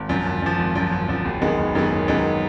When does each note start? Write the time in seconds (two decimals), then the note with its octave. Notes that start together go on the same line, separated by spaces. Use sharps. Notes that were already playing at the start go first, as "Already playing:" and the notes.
Already playing: G#1
0.09 F#2 F3
0.26 G#1
0.42 F#2 F3
0.59 G#1
0.75 F#2 F3
0.92 G#1
1.08 F#2 F3
1.25 F#1
1.41 F#2 D#3 G#3 B3
1.58 F#1
1.75 F#2 D#3 G#3 B3
1.91 F#1
2.08 F#2 D#3 G#3 B3